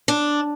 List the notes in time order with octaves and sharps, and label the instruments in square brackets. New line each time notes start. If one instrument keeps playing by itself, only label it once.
[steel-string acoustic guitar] D4